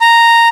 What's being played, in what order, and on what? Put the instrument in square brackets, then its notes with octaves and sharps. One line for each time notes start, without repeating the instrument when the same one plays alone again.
[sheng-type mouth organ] A#5